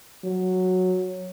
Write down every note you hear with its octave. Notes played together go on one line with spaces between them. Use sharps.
F#3